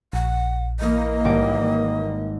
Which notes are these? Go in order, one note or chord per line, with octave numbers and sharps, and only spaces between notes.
A#1 F#5
E3 A#3 D#5
G#1 G3 D6